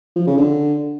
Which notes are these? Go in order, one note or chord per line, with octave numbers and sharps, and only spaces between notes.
F3
C#3
D3